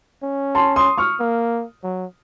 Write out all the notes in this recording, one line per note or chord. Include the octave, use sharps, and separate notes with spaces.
C#4
A5 C6
C6 D#6
C#6 F6
A#3
F#3